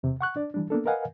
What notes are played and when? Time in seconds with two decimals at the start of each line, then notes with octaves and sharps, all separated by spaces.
0.03 E2 C3
0.21 F#5 C#6 F#6
0.36 D4 D5
0.54 E3 G3 D4
0.70 A#3 B3 D4 A4
0.86 A#4 B4 D#5 F5 F#5 G#5